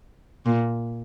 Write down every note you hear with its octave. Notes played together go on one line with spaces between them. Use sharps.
A#2